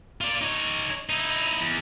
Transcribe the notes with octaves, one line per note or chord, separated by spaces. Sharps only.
F4 D5
D#4 C#5
D#4 E4
E2